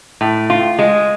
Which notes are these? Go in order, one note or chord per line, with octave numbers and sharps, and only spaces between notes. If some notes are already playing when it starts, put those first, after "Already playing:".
A2
F4
G#3